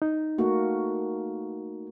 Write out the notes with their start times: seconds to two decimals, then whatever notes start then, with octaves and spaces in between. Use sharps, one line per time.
0.02 D#4
0.38 A3 A#3 F#4